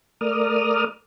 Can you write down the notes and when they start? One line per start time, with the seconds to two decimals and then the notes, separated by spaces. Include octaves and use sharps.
0.21 A3 A#4 D5 D#6 F6